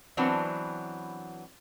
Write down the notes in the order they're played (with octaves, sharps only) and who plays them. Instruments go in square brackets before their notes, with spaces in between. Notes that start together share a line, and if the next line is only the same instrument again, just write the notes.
[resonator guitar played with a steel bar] E3 F#3 B3 C4 D4